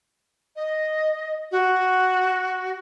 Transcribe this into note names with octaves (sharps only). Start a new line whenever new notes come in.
D#5
F#4